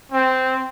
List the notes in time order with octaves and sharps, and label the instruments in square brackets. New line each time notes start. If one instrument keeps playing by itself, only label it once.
[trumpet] C4